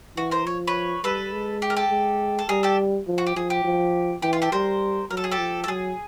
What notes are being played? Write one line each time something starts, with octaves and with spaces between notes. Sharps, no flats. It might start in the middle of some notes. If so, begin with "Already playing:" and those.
E3 F#4
A#4 C5
F3 C#5
B4 C#5
G3 A4 B4
G#3
G4
A#4
G4 A4
G#3
A4
G3 G#4 A#4
G4 A4
F3
F#4
G4
F3 G#4
G4
F3
E3 G4
F4
G4 A4
G3 A#4 C5
F#3 A#4
A4
G#4
G4 A4
F3
A4
F#3 G#4